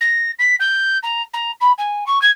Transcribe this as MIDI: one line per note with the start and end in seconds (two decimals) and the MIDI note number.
0.01 0.31 94
0.39 0.56 95
0.60 0.98 91
1.03 1.22 82
1.33 1.52 82
1.61 1.72 83
1.78 2.04 80
2.06 2.21 85
2.22 2.30 92